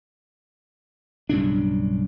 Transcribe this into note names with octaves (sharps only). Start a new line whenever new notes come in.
B1 G2 C#3 D4